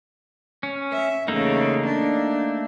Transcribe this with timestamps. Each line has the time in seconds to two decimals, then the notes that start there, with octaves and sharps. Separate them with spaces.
0.63 C#4
0.93 E5
1.28 E2 C#3 A3 A#3 D#4
1.86 D4